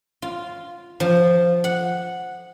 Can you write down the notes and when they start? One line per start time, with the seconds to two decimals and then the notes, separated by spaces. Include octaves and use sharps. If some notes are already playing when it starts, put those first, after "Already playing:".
0.22 F4
1.00 F3
1.64 F#5